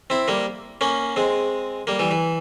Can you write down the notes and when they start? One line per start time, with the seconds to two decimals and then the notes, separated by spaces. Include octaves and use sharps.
0.10 C4 E4
0.28 G3 A#3
0.81 A#3 C#4
1.16 G#3 C4
1.87 G3 A#3
1.99 E3 G3
2.11 E3